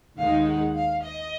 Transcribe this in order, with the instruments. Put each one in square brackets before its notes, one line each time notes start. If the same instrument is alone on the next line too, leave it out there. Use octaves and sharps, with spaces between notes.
[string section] D#2 D#3 G#3 D#4 [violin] F5
[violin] F#5
F5
D#5